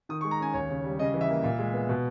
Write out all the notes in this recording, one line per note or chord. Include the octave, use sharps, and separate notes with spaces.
D#3 D#6
C#6
G#3
A#5
C#4 G#5
D#2 C#5
C#3
G3
C#3 D#5
E3
E5
A#3
A#2
G#3
B3
B2